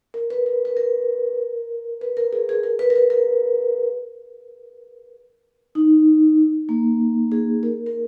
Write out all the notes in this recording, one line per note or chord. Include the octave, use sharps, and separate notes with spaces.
A#4
B4
A#4
B4
A#4
B4
A#4
G#4
G#4
A#4
B4
A#4
B4
A#4
D#4
A#3
G#4
A#4
A#4